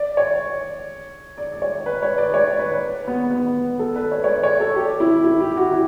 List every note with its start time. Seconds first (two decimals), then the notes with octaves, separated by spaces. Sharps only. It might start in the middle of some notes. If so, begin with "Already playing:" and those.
Already playing: D5
0.17 C#5
1.38 D5
1.53 D5
1.62 C#5
1.86 B4
2.03 C#5
2.18 D5
2.34 C#5
2.59 B4
2.71 B4
3.07 B3
3.31 B3
3.79 A4
3.96 B4
4.11 C#5
4.24 C#5
4.28 D5
4.43 C#5
4.60 A4
4.76 G4
5.00 E4
5.24 E4
5.41 G4
5.57 F#4
5.72 E4